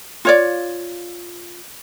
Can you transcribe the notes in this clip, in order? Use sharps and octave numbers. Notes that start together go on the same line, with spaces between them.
F4 C#5 D5